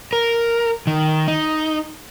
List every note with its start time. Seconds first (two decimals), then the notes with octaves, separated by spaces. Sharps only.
0.13 A#4
0.87 D#3
1.28 D#4